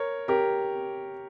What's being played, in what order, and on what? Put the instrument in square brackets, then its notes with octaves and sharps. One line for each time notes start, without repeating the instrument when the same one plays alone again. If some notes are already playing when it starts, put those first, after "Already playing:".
Already playing: [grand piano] A#4 C#5
G4 A#4